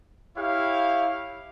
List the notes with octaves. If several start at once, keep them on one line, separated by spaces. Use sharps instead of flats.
E4 G4 C#5 F5